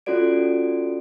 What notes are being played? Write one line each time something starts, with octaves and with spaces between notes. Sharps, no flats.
C#4 F4 F#4 A4 D5 D7